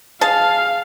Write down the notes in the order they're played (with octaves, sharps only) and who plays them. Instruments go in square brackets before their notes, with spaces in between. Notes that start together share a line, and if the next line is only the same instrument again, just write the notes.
[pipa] G#4 A5 [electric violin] F5